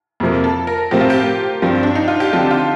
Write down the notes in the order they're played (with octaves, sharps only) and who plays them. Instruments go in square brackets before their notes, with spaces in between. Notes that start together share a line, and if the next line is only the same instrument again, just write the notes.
[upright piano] F2 C3 F3 A#3
[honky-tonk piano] A4
A#4
[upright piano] A2 F3 C4 [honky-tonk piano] G4
[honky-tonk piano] F4
G4
[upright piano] G2 F3 C4
[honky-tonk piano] D4
D#4
F4
G4
[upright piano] D3 F3 C4 G4 [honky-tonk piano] A4
[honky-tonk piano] F4